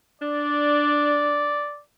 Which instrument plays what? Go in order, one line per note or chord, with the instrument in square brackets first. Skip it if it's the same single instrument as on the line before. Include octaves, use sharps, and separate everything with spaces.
[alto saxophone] D4 [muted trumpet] D5